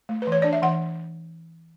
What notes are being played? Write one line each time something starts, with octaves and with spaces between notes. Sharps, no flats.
A3
B4
E3
C#5
D4 D5
E5
E3 F#5